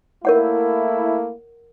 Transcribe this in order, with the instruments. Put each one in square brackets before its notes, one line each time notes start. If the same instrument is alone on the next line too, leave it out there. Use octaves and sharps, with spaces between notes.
[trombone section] A3 A#3 E4 [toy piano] A#4 C#5 F#5